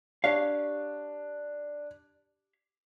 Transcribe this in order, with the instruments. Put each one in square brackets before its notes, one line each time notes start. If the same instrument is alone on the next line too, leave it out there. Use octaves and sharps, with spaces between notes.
[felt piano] D4 [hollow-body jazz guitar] G4 C#5 F5